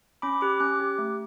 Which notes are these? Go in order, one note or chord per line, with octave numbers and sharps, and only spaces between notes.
C#4 B5 D6
G4 D6 F#6
C#4 D6 F#6
G4
A3